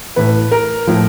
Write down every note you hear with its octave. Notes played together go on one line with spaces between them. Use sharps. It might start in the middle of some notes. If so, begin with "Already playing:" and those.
A2 E3 B4
A#4
A2 F3